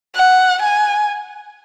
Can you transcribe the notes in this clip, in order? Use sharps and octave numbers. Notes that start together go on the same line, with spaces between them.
F#5
G#5